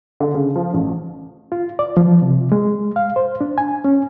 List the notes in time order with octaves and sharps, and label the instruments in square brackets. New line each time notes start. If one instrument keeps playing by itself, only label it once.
[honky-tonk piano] D3
C#3
F3
A1
[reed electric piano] F4
D5
F3
C3
G#3
F5
C5
D4
G#5
C#4